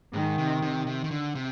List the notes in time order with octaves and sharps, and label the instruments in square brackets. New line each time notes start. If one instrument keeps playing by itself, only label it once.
[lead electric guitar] G#2 [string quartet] D#3
[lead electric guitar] C3
C3
C3
D#3
D3
C3